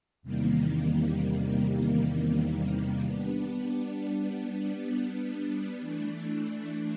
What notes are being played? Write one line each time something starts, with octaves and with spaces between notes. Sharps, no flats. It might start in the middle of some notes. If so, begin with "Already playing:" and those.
E2 C3 D#3 G3 A#3
G3 B3 D4
E3 A3 D4